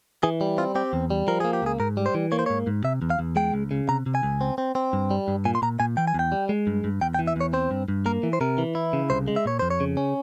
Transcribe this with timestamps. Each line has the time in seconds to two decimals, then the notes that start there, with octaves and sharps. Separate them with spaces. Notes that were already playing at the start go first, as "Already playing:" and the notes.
0.23 E3 G#4
0.41 G3
0.58 C4 F4
0.75 C4 G4
0.93 E2
1.10 G3
1.28 F3 A#4
1.40 A#3 G#4
1.53 G4
1.62 C#2 G#4
1.80 G#2 A#4
1.97 G3
2.06 C5
2.15 E3
2.32 A#3 C#5
2.39 C5
2.46 G#2 C#5
2.67 G#2
2.84 C3 E5
3.02 E2
3.10 F5
3.19 E2
3.36 G#3 G5
3.54 C#2
3.71 C#3
3.89 C3 A#5
4.06 C3
4.15 G#5
4.23 C#2
4.41 C4
4.58 C4
4.75 C4
4.93 G2
5.11 G3
5.28 G2
5.45 A#2 G#5
5.55 C6
5.62 A#2 A#5
5.80 A#2 G#5
5.97 E3 G5
6.07 G#5
6.14 E2 G5
6.32 G3
6.49 G#3
6.67 G2
6.84 G2
7.01 E2 G5
7.14 G5
7.19 E3
7.27 E5
7.36 E2 C#5
7.53 C4 C5
7.71 G2
7.88 G2
8.06 A#3 A#4
8.23 E3
8.33 C5
8.41 C3 A#4
8.58 E3
8.75 E4
8.93 C#3
9.10 C2 C5
9.28 G#3
9.36 E5
9.46 A#2 C#5
9.59 F2 C5
9.70 C#5
9.80 C#3
9.97 C#4